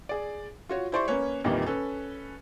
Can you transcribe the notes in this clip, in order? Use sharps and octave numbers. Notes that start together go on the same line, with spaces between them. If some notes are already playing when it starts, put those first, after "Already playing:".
G#4 D5
F4 F#4 C#5
E4 G4 C5 D5 C6 C#6
A#3 C#4 B4 C#5
F2 A#2 D#3 E3 G3 A#3
C#4 A4 B4